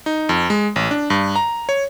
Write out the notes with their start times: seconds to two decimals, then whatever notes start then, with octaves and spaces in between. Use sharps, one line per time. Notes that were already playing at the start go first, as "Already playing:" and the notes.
0.06 D#4
0.29 F2
0.50 G#3
0.76 A1
0.91 D4
1.10 G2
1.36 A#5
1.69 C#5